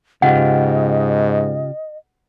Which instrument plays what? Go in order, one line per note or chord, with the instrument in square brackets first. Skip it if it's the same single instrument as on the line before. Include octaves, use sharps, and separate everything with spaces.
[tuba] G#2 [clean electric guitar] C#3 F4 G4 [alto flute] D#5 [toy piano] F#5